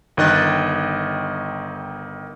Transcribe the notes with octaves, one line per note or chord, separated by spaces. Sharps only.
G1 D#3 D#5 F#6 A6